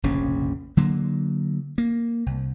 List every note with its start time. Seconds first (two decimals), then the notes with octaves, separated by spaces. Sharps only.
0.03 F1 A#1 C#3 C#4
0.77 D3 F#3 A#3
1.78 A#3
2.26 C2